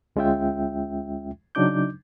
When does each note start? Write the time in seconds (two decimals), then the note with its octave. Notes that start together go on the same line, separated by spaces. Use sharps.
0.16 D2 G#3 C#4 F4 E5 G5
1.55 C#3 F#3 D4 D#4 D6 G6